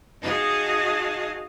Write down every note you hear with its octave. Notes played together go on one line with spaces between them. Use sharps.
D#4 F#4 G#4 D#5 F5 A5